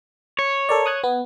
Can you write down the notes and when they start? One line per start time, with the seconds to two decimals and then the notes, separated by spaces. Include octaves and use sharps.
0.39 C#5
0.69 A4 A#4 D5
0.86 D#6 F#6 G#6
1.04 B3